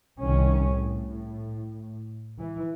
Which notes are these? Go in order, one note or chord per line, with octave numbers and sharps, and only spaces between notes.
C2 D#3 C#4
A2
E3